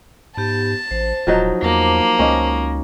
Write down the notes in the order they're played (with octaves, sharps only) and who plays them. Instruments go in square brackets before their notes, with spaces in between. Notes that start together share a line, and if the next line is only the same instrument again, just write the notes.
[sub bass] G#2 [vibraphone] B3 G4 [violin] A5
[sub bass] A1 [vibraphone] C5
[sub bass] D#1 [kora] F3 F#3 D#4
[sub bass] E2 [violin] A#3 [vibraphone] C5 A5 D6
[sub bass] C#2 [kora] C#4 D#4